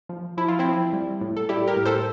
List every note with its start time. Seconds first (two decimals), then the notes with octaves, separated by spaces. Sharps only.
0.09 F3
0.37 F3 E4
0.48 F4
0.59 C4 E4
0.65 F3
0.93 G3
1.21 A2
1.37 A4
1.49 G3 E4 G4
1.68 G4 A#4
1.76 A2
1.85 A4 C5